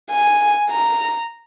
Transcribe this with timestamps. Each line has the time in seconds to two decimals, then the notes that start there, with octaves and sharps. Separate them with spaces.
0.12 G#5
0.70 A#5